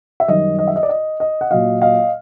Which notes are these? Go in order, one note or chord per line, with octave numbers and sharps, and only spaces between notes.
E5
F#2 D#3 G3 D#5
D#5
E5
D#5
D5
D#5
D#5
F#5
A#2 F#3 D#5 F5
D#5 F5